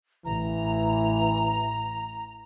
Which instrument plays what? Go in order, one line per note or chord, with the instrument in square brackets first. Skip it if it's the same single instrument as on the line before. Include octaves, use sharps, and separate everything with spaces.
[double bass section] A1 [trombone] E3 [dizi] A#5